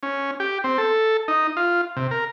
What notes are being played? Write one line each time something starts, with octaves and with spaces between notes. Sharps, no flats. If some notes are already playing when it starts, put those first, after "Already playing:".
C#4
G4
C4
A4
D#4
F4
C3
A#4